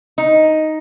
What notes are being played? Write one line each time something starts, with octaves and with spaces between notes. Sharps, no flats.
D#4